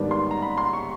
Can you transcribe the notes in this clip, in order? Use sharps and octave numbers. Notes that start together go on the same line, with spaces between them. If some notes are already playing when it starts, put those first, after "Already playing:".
Already playing: G#2 D#3 G3 B3 D4
C6
A#5
B5
C6
C#6